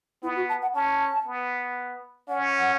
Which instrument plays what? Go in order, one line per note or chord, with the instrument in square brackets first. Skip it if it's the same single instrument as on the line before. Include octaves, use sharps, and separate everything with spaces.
[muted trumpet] B3 [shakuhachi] E4
[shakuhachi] F#4
A5
F#5
[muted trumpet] C#4 [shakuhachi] A5
[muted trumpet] B3
[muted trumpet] C#4 [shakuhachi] F#5